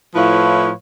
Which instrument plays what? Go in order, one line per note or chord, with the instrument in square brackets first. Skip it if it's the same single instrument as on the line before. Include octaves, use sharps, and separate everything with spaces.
[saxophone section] A2 F3 E4 B4 C#5 F5